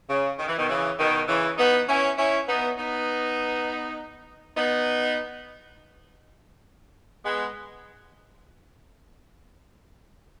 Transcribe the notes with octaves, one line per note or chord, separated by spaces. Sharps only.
C#3
D#3
E3
B2 D#3
C#3 E3
B2 D#3
C#3 E3
B3 D#4
C#4 E4
C#4 E4
B3 D#4
B3 D#4
B3 D#4
G#3 B3